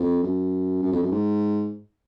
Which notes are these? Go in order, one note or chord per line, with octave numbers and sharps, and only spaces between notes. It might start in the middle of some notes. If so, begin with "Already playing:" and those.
Already playing: F2
F#2
F#2
F2
F#2
G#2